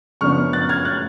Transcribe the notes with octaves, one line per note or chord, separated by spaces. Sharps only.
F#2 C#3 F3 B3 D4 C#6 F6
F#6 A6
F6 G#6
F#6 A6